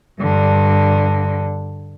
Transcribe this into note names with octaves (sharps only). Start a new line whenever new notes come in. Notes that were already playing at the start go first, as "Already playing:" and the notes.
G2 D3